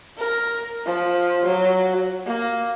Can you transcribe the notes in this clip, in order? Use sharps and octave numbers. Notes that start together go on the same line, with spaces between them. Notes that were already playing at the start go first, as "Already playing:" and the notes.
A#4
F3
F#3
A#3